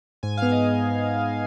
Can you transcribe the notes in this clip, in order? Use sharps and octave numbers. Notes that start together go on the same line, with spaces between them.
G#2 G#5
B3 F5
D#5